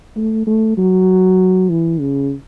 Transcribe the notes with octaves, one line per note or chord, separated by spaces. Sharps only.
A3
A3
F#3
E3
C#3